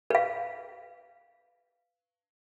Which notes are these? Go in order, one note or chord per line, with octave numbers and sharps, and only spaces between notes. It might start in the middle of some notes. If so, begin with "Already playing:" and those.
B4 F5